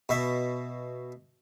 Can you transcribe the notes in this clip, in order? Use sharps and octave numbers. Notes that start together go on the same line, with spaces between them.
B2 E5